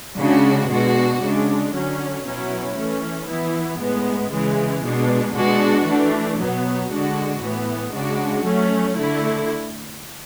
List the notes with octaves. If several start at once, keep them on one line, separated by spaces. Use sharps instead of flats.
C#3 G#3 D4 F#4
B2 G#3 D4 F#4
C#3 G#3 D4
D3 F#3 C#4
B2 F#3 C#4 E4
E3 A3 C#4
E3 B3 E4
A2 G#3 B3
C#3 E3 G#3
B2 G#3 D4
B2 G#3 D4 F#4
E3 A3 D4
B2 F#3 B3
D3 G#3 D4 F#4
A2 E3 B3
C#3 G#3 D4 F#4
F#3 A3 C#4
D3 A3 E4